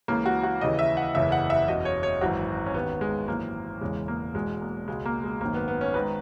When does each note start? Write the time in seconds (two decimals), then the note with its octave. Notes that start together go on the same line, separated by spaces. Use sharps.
0.08 C#2 C#3 E3 A#3
0.26 F#4
0.43 F#4
0.61 D#2 C#3 E3 D#5
0.79 E5
0.97 F#5
1.15 F#1 E2 C#3 E3 E5
1.32 F#5
1.50 E5
1.68 F#1 E2 B2 D#5
1.85 C#5
2.03 C#5
2.21 G#1 F#2 E3 F#4
2.66 C#4
2.74 D#2 D#3 B3
3.01 G#3
3.28 G#1 F#2 E3 A#3
3.81 E1 E2 C#3 E3 G#3
4.08 A#3
4.35 E1 E2 B2 G#3
4.61 A#3
4.88 C#2 B2 G#3
5.06 A#3
5.23 G#3
5.41 G#1 F#2 D#3 A#3
5.54 B3
5.68 B3
5.81 C#4
5.94 G#1 G#2 D#3 B4